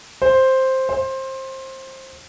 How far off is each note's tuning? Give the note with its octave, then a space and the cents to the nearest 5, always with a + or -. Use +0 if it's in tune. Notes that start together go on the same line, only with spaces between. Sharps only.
C5 +5
C5 +20